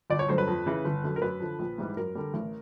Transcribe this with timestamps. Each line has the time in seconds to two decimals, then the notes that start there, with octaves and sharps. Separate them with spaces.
0.10 G1 D5
0.19 C#5
0.28 G2 D3 F#3 C5
0.38 B4
0.47 F2
0.66 C#3 E3
0.85 G1
1.04 F#2 D3
1.16 A#4
1.22 F#2 B4
1.40 D3 F3
1.59 A#1
1.78 G#2 E3 G3
1.97 F#2 A#4
2.15 D3 G3
2.34 A1